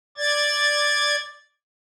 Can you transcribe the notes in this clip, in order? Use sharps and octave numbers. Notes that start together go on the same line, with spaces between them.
D5 G#6 A6